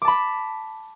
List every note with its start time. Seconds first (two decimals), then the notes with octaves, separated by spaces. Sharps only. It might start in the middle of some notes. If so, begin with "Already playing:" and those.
0.02 D6
0.05 A5
0.08 B5